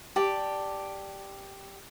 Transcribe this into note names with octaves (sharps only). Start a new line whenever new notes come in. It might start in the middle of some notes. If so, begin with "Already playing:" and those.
G4 D5 A5